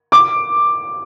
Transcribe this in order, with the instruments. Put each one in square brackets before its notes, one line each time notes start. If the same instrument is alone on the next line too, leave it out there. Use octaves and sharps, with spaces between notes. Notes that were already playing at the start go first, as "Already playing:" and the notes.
[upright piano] D6